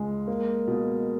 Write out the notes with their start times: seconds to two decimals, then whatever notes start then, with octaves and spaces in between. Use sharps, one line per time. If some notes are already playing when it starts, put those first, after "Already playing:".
Already playing: C#2 G#3
0.28 A#3
0.67 B2